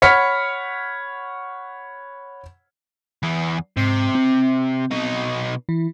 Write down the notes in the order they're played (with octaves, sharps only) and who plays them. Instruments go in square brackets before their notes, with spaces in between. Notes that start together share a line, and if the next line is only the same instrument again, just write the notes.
[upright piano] C#5 F#5 B5 F6 B6 C#7
[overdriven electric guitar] E2 E3
[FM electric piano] G#2 C7 [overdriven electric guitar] C3
[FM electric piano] C4
[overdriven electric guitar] B2 D#4
[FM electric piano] E3 E4